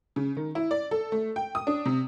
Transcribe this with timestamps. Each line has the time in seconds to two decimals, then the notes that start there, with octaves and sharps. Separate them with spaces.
0.16 C#3
0.37 D#3
0.55 E4
0.71 D5
0.91 A4
1.12 A3
1.36 G5
1.55 D#6
1.67 D4
1.85 C3